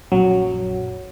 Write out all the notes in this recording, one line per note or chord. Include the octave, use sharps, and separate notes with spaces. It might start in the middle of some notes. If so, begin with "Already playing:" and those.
A#1 F#2 F#3